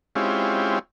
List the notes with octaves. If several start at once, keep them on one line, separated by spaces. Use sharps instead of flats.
G#3 C4 C#4 E4 F4 G4